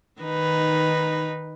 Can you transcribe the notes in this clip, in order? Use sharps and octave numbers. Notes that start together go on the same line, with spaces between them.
D#3 D#4 B4